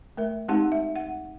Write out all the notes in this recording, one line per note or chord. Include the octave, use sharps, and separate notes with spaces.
A3 A#4 E5
G#3 C4 D#4 G4 F#5
E5
F#5